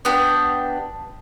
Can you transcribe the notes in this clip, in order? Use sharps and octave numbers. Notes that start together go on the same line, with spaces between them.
B3 D4 G4